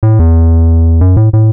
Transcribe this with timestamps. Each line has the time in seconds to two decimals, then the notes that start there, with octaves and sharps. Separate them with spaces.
0.03 A2
0.19 E2
1.01 F#2
1.17 A2
1.33 A2